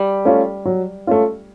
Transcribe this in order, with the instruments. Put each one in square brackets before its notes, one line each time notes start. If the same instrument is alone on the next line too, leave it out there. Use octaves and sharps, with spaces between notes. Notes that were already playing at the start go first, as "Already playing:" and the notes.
Already playing: [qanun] G3
[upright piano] A3 C#4 F4
F#3
A3 C#4 F4